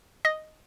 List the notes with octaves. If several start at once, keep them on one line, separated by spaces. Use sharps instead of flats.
D#5